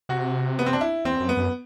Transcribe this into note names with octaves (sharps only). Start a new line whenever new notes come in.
C3 F#4
B3
C4
D4
E4
E2 C4
F#2
B3
F#2